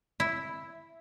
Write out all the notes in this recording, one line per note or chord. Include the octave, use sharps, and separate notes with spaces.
E4